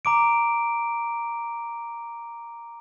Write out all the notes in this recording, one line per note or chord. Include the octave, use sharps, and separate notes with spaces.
A#5 D6 D7